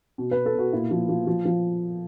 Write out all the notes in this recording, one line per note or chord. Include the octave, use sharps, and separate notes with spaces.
B2
B4
B2
A4
B2 F#4
A#2 E4
F3
F3
F3
F3